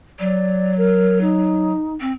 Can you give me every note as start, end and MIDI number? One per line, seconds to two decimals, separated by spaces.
0.19 1.72 54
0.19 0.74 74
0.77 1.18 70
1.21 1.93 63
2.01 2.12 60